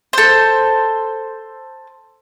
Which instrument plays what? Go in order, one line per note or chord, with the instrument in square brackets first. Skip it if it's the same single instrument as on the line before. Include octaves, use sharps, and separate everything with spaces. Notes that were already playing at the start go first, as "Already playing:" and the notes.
[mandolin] A4 C5